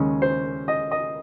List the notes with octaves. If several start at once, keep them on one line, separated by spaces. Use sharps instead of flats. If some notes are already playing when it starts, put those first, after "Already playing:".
Already playing: D#2 C#3 G#3 C#4
C5
D#5
D#5